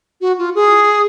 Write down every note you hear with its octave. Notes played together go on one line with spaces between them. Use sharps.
F#4
F4
G#4